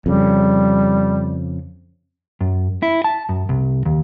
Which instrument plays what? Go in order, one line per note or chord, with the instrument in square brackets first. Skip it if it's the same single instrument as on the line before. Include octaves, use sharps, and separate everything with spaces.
[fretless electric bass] F2 C#3 [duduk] G3
[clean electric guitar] F#2
E4
A5
F#2
C2
D#2